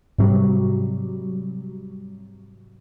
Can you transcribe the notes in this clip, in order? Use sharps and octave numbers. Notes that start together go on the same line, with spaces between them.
G#2 C3 F#3 G3